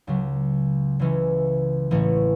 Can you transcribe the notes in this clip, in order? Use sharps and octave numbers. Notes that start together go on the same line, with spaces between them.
C#2 C#3 F#3
C#2 C#3 E3 G#3 C#4
A1 A2 E3 A3 C#4